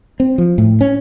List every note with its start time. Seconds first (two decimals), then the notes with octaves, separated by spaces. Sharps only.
0.20 C4
0.38 F3
0.58 A2
0.81 C#4